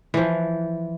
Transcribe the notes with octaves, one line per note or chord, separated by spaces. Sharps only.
E3 F3